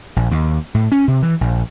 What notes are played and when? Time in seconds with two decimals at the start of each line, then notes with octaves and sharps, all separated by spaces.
0.16 A#1
0.31 D#2
0.75 A2
0.92 C#4
1.08 C3
1.22 E3
1.41 A#1